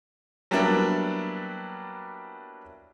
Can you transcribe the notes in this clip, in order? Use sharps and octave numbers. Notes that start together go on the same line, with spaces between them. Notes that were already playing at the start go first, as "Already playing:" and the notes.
F#3 G3 A#3 B3 D4 E4